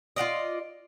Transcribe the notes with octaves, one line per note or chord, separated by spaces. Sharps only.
F4 F#4 D5 D#5